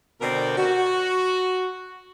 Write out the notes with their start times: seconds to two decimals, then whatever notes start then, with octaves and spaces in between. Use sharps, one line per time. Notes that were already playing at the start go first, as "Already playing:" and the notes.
0.21 B2 D3 C4 A#4 D5 G5
0.57 F#4